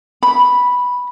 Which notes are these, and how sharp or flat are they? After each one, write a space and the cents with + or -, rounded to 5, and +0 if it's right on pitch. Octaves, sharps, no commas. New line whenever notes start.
B5 -5